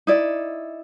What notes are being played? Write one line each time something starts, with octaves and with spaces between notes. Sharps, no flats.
D#4 E4 D5